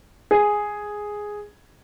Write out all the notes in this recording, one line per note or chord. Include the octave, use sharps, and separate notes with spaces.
G#4